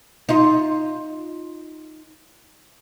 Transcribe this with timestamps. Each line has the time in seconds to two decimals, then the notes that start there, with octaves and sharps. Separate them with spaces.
0.29 D#4 F4